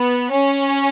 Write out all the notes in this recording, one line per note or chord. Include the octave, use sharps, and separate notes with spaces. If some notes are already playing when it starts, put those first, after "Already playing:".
Already playing: B3
C#4